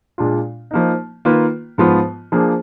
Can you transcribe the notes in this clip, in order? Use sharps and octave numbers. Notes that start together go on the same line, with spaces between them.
A#2 G#3 D4 F4
F3 A#3 D#4
D#3 A#3 F4 B4
G#2 F3 B3 F4
F3 A#3 D4 G#4